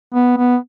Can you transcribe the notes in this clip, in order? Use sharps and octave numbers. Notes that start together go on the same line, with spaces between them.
B3
B3